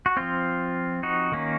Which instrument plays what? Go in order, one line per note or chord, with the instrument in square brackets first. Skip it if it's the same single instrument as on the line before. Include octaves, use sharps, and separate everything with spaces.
[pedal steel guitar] F#4
F3 C4 F4
D#4 F#4
D#3 A#3 C#4